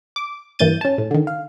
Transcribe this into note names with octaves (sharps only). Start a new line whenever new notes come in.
D6
G2 E3 A#3 G6 A6 D#7
C#4 A5
A2
D3 D#3
F5